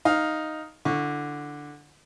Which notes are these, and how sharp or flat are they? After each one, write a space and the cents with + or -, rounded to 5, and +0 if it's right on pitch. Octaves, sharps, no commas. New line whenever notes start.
D#4 +0 F5 +5
D3 +0 E4 +30 C#6 +0